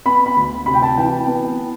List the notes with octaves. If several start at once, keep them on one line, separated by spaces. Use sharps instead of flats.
B3 B5
B5
D2
C3 B5
G5
A5
E3 G5
B3